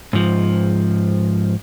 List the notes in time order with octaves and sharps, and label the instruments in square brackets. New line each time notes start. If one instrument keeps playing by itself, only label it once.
[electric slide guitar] G#2 F3